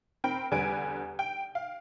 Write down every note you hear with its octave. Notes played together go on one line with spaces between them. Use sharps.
C4 A#4 G5 B5
E2 D3 G3 B4 G#5 D7
G5
F5